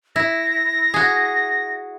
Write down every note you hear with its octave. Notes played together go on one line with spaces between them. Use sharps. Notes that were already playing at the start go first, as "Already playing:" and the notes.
E4 A#6
F#4 G#4